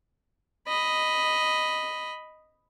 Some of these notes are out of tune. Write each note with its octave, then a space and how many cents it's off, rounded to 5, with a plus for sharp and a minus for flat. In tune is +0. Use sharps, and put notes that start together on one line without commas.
D#5 +0 B5 +0